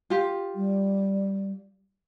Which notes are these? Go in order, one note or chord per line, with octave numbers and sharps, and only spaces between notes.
F4 G4
G3